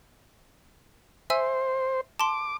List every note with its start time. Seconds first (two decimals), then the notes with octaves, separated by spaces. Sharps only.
1.30 C5 E5 G#5 E6
2.19 A5 C6 D6